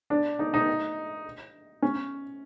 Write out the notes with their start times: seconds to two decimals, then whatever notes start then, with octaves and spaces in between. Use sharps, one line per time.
0.10 D4
0.39 D#4
0.54 D#4
1.82 C#4